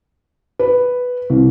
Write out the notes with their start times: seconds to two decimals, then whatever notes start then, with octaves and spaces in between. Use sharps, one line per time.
0.59 B4
1.30 C2